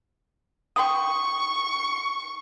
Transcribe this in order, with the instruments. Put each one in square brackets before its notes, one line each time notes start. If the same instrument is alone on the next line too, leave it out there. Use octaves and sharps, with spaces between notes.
[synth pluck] G5 D#6 [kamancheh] C#6